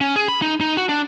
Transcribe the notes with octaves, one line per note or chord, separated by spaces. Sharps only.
C#4
G#4
B5
D#4
D#4
F#4
D4